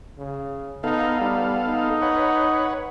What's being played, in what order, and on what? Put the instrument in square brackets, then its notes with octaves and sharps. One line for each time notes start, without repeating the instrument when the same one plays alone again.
[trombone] C#3
[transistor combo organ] B3 A4 F5 [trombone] D#4
[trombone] G3
D#4
[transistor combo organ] B4 C#5 F#5